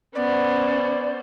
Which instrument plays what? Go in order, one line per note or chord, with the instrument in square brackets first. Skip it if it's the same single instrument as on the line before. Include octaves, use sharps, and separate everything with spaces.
[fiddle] B3 [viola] C#4 C5 [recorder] D5